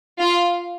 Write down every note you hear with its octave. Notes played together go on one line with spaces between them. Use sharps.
F4 F5